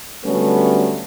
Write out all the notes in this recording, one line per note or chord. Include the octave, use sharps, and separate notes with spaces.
D3 F#3 G3 A3 B3 C#4